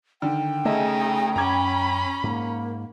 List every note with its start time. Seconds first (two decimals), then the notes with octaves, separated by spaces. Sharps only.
0.22 D3 D#3 G5
0.65 C#3 A3 D#4 G#4 D#5 E5
1.36 F#2 C#4 A#5 B5 D6 G#6
2.24 G#2 A#3